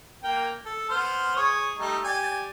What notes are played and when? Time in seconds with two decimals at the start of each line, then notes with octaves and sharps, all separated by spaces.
0.24 A#3 A#4 G5
0.65 A4
0.89 B3 C5 F6
1.36 G#4 C#5 D#6
1.78 G3 A3 D#4
2.04 G4 D5 G#5